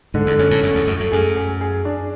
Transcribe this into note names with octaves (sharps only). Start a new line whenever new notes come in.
G#2 D3
E2
F#2 C#4
A2
F#2 A3
E2
F#2 A3
F#2
F#2 G#4
G#4
G#4
D4